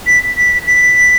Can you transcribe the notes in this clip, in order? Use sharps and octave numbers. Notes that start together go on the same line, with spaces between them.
B6
B6
B6